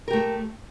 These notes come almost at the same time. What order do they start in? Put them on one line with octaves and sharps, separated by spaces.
A#4 G4 A3